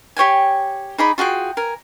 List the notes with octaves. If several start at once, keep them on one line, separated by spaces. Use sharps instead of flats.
G4 C#5 G5 G#5
D#4 G#4 D5 B5
F4 F#4 G#4 G5
A#4 G#5